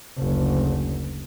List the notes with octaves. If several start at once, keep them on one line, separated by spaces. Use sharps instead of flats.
F#1 D2